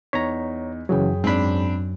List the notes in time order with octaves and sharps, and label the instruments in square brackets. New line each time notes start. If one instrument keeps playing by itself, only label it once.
[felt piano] E2 D#4 B6 [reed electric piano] C#5 A#5
[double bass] F#2 [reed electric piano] C#3 E3 F#3 [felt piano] G#4 C#5 G5
[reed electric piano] G#2 B5 [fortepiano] C4 D4